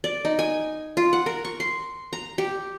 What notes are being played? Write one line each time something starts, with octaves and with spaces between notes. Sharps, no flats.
D5
D#4
G#5
F4
F#5
A#4
C#6
C6
A#5
G4